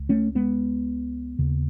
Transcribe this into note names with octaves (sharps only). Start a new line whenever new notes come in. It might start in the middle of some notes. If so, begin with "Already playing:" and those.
Already playing: C#2
A3 C#4
G#3 B3
D#2 C#3